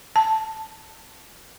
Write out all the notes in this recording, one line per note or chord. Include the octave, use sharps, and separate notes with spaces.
A5